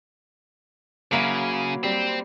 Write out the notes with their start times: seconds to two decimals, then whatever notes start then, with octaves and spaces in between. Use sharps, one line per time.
1.12 C#3 F#3 A#3 E4
1.83 G3 C4